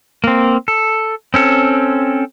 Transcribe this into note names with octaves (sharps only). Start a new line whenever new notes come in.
A#3 C4
A4
C4 C#4 A4